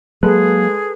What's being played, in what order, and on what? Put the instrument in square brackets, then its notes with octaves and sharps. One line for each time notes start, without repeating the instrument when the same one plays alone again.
[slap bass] F#3 A#3 [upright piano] G#3 [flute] G#4 [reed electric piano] A4 B4 F#6